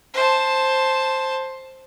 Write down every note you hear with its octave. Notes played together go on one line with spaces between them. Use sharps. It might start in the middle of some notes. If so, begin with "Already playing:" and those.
C5 A5